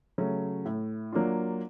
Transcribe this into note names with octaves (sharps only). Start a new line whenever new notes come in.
C#3 F#3 A3 C#4
A2
F#3 A#3 D4 F4